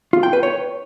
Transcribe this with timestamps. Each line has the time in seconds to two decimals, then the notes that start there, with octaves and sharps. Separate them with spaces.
0.13 F4
0.23 G5
0.33 B4
0.43 C#5